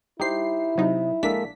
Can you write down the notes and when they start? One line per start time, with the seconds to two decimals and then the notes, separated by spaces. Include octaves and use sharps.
0.20 G3 D#4 E4 G4 C5 C7
0.78 C3 F#3 D#4
1.23 A#1 G#3 A#3 D4 A4 B6